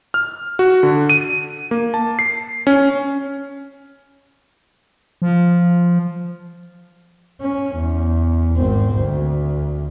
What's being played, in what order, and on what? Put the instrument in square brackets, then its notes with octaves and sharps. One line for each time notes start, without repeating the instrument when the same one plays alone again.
[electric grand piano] F6
F#4
D3
D#7
A#3
A5
C7
C#4
[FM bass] F3
[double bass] C#4
E2
G#1 C4
D2